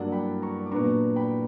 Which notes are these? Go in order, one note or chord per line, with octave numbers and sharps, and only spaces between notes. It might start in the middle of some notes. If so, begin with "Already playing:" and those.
Already playing: G2 F#3 A#3 D4 D5 F#5
G5 B5
A#5 C#6
D6
A#2 F#3 B3 D4 A#5 C#6
G5 B5